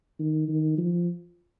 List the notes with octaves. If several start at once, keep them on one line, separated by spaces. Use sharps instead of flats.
D#3
D#3
F3